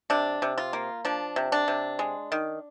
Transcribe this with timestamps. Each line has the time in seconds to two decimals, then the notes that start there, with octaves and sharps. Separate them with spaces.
0.10 C3 D4
0.42 C3
0.58 F4
0.73 A#3
1.05 F3 D4
1.36 C3
1.52 D4
1.68 C3
1.99 G#3
2.32 D#3